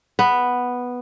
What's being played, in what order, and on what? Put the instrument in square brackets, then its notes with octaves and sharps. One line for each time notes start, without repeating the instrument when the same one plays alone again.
[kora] B3